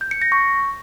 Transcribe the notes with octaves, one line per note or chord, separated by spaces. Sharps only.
G6
C#7
A#6
C#6